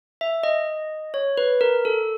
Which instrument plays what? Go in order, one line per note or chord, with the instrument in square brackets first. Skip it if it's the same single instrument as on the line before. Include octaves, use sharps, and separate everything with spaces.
[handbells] E5
D#5
C#5
B4
A#4
A4